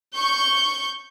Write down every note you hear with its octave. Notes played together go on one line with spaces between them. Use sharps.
C#6 G6